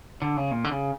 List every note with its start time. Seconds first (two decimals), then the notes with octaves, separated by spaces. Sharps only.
0.22 D3
0.37 C#3
0.51 A#2
0.64 D3
0.72 C#3